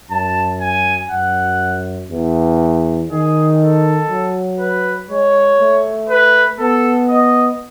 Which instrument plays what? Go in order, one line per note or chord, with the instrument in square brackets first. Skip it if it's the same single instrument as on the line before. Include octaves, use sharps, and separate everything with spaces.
[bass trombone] F#2 [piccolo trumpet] A5
[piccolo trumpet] G#5
[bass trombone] F#2 [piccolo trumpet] F#5
[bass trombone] E2
[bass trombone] D#3 [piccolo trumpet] G#4
[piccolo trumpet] A4
[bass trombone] F#3
[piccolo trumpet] B4
[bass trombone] G#3 [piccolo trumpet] C#5
[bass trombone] A3
[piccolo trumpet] B4
[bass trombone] B3 [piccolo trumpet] A4
[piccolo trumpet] D#5